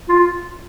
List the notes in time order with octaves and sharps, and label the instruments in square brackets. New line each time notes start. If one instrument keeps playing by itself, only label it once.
[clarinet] F4